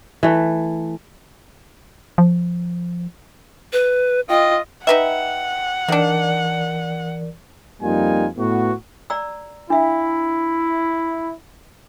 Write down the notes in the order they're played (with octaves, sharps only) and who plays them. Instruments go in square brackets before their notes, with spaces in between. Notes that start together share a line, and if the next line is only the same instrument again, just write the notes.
[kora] E3 A3
[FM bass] F3
[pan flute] B4
[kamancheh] F4 D#5 [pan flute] G5
[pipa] D#4 B4 E5 [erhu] F#5 [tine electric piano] G5
[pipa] D#3 D4 [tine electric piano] E3 A#4 D5
[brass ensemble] F2 G3 A#3 D#4 F4 G#5
A2 B3 F#4
[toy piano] D5 A#5 E6
[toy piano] D4 E5 F5 [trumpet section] E4